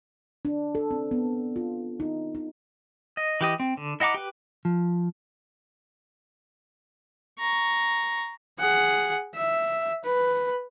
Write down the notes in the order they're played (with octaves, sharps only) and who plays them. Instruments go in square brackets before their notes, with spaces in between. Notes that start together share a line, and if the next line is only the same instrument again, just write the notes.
[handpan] D4
A4
C4
B3
F4
D#4
D#4
[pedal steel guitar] D#5
E3 G4 D#5
C4
D3
E4 D#5 F#5 A#5 D6
G4 B4
[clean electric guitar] F3
[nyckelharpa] A#5 C#6
[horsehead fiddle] G#4 F#5
E5
B4